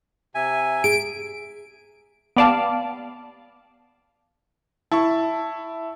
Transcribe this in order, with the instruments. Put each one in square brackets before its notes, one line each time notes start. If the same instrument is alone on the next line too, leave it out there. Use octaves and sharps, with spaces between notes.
[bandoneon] C3 E5 [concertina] G#5
[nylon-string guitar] G#4 [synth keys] D7
[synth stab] B3 G4 D5 F5 A5
[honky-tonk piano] E4 [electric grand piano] A5 C#6